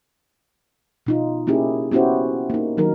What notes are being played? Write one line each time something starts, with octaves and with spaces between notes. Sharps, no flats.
B2 D#4 F4
A#3 C#4 E4 G4 G#4
B3 C#4 E4 F#4 G4 C5
A#3 D#4
D#3 F#3 D#4 A#4